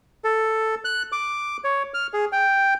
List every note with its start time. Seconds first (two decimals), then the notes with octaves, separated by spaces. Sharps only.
0.24 A4
0.85 F#6
1.12 D6
1.64 C#5
1.94 F6
2.13 G#4
2.32 G5